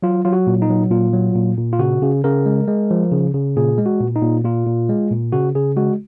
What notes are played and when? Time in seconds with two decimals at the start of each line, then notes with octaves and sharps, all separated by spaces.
0.03 F#3 F4
0.25 F#3 F4
0.33 F#4
0.47 A#2
0.62 D#4
0.69 F#3
0.91 A#2 F4
1.13 F#3
1.35 A#2
1.58 A#2
1.73 F4
1.79 C#3 F#4
2.02 C#3
2.24 C#3 A#4
2.46 G#3
2.67 G#3
2.91 F3
3.12 C#3
3.34 C#3
3.56 A#2 G#4
3.78 G#3
3.86 F#4
4.00 A#2
4.16 D#4
4.22 A#2
4.44 A#2 F4
4.67 A#2
4.89 G#3
5.11 A#2
5.33 C#3 F#4
5.55 C#3 G#4
5.76 G#3 F#4